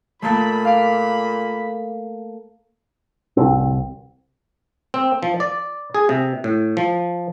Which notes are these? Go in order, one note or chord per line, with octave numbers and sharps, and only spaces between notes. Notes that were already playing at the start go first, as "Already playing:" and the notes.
A#2 A3 A#3 A4 B5
F5 D6
D1 C2 C4
C4
F3
D5
G#4
C3
A2
F3